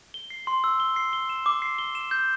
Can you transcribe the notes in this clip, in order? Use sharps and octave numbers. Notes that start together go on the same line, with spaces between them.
G7
C7
C6
E6
G7
C7
G7
E7
D6
C7
G7
E7
G6